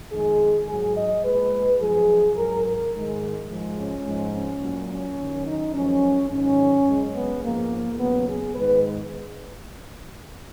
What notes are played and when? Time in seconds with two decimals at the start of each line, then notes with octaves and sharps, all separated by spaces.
0.12 F2 D#3 G#3 G#4
0.68 G#2 F#3 G#4
0.96 D#5
1.24 A#2 G#3 B4
1.80 F#2 F3 G#3 G#4
2.37 G#2 F#3 A#4
2.65 A#4
2.93 G#2 D#3 G#3
3.49 G#2 F3 G#3
3.78 C#4
4.05 G#2 F3 G#3
4.34 C#4
4.62 A#2 F#3
4.90 C#4
5.18 F#2 D#3 F#3
5.46 D#4
5.74 F#2 F3 G#3 C#4
6.30 G#2 D#3 F#3 C#4
6.86 F#2 C#3 G#3
7.14 B3
7.43 G#2 F3 G#3 A#3
7.99 D#2 C#3 F#3 B3
8.27 G#4
8.55 G#2 D#3 G#3 B4